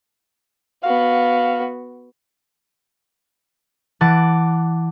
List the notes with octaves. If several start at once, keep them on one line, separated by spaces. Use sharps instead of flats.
B3 F#4 F5
E3 F#5 A5 D6